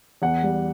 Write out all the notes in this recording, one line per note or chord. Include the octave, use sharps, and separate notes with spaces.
E2 F#5
G3